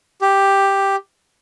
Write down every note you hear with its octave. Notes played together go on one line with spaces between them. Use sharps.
G4